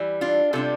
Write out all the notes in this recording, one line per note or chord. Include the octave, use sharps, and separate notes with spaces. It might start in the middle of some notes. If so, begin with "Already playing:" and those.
Already playing: E3 G3
D4 F4
C3 G3 D4 F4 A4